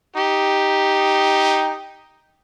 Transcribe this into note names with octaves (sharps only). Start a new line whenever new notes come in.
D#4 G4